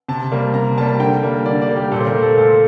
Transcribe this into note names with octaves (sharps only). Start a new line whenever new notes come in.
C3 A5
G3 A#3
C3 A#5
G3 A#3 A5
D3 G5
G3 A#3
D3 D5
D5
G3 A#3
G4
A#2 A4
C5
A#4
A3
A4
A#2 A4